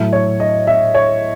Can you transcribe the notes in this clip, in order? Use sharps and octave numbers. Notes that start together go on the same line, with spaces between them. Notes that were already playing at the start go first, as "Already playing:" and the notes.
Already playing: A2 F#3 A3 E5
C#5
D#5
E5
C#5